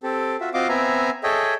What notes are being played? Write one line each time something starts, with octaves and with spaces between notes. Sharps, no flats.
C4 G4 A4
F4 F#4 E5
C4 F4 F#4 D#5 F5 D6
B3 C4 E5 G#5 A#5
G#4 A4 C#5 D#5 E5 G5